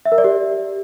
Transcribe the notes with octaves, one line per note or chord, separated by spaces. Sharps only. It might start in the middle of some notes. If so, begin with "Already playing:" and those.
E5
A#4
D5
G4